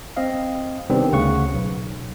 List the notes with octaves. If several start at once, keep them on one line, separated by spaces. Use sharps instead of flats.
C4 D#5 F5
C3 D#3 G3 B3 C4 D4
D2 C#3 F#5 C#6
B1